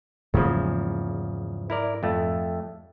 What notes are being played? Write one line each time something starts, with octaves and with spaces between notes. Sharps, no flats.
E2 G#2 C#3 F3 F#3 A#3
E4 A#4 D5
F2 A3